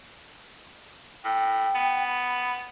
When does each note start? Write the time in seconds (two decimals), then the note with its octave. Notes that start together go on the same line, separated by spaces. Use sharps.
1.25 A2 G5
1.75 B3
2.07 B5